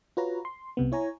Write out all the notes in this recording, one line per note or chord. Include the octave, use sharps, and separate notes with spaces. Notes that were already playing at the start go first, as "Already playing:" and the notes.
F4 F#4 B4 C#5 A#5
C6
C2 C3 B3
E4 C#5 G#5 A#5